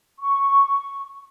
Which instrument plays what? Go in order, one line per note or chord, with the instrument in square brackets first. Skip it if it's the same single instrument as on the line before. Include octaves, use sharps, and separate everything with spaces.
[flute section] C#6